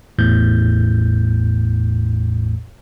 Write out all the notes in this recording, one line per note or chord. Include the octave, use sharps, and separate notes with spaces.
G#1 E2 A2 G6